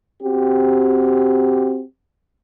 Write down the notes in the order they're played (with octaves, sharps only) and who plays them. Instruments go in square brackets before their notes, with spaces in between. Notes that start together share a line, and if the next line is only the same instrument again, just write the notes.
[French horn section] C4 F#4 G4